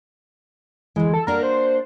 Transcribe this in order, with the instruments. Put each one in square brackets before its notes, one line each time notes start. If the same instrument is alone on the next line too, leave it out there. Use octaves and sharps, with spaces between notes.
[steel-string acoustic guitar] D2 E3 [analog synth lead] G#3
[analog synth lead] A4
[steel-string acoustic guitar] A#3 D4 F#4 [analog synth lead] A#4
[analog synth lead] C5